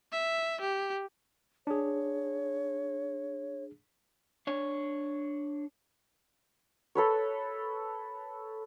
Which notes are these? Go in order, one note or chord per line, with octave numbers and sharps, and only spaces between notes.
E5
G4
D4 G#4 C#5
D4 C#5
A4 B4 C#5